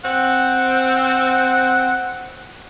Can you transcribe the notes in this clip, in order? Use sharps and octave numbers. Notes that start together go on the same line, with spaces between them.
C4 F#5